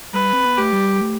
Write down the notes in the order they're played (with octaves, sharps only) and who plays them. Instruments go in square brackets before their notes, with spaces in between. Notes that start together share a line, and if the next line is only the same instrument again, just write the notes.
[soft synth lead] G3 [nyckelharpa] B4
[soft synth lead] C4
B3
[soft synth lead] A3 [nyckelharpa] G4
[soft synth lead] G3
A3